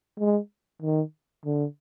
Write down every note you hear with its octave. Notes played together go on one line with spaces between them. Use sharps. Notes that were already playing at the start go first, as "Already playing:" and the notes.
G#3
D#3
D3